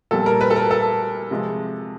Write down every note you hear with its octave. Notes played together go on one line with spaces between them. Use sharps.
A#2 G3 A4
A#4
B4
A4
A#4
A4
C3 F3 G#3